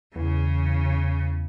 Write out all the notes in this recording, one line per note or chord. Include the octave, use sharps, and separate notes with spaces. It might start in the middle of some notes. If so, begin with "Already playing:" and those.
E2 C#3